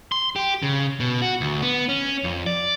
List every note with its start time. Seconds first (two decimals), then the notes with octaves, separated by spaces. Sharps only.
0.12 C6
0.36 G4
0.63 C#3
1.00 B2
1.22 F#4
1.41 D2
1.62 B3
1.89 C#4
2.24 F2
2.46 D5